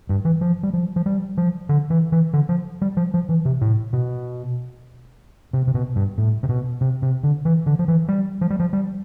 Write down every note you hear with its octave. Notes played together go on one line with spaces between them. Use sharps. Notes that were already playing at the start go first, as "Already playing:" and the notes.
G2
E3
F3
G3
F3
F3
G3
F3
D3
E3
E3
D3
F3
G3
F3
F3
E3
C3
A2
B2
C3
C3
B2
G2
A2
C3
B2
C3
C3
D3
E3
D3
F3
E3
G3
F3
G3
F3
G3